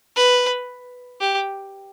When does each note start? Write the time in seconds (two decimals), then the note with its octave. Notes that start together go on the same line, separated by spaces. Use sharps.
0.16 B4
1.21 G4